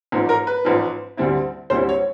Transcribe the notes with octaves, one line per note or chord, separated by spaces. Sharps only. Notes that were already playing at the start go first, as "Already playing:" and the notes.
A1 G#2 F3
A#4
B4
A1 G#2 F3
D2 D3 G3 C4 E4
D2 D3 G3 C4 E4 C5
C#5